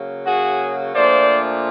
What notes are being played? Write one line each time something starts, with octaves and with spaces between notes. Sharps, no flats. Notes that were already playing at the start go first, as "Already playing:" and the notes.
Already playing: C#3 F#3 A#3
F#4 G#4
A#2 F3 A3 D4 C5 D5